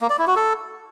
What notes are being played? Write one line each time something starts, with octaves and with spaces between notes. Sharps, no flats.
A#3
D5
E4
F#4
A4